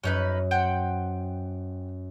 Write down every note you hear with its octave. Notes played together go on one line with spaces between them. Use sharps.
F#2 C#4 D#4 B4
C5 F#5 G5